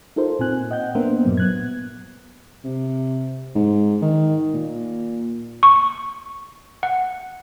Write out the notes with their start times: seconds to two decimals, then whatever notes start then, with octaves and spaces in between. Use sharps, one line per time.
0.16 D#4 F4 A4 A#4 C5
0.39 A#2 C4 G#5 F#6
0.71 D#5 F#5 G5 G6
0.95 A#3 B3 D4 A#4 C5 E5
1.25 G2 A#2 F#3
1.37 B3 F#6 G#6
2.64 C3
3.55 G#2
4.02 D#3
4.54 A#2
5.63 C#6
6.83 F#5